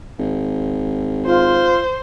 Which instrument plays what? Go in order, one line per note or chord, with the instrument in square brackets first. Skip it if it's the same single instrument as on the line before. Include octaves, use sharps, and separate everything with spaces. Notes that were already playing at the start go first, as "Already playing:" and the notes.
[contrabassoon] G#1
[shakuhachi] F4 [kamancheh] C5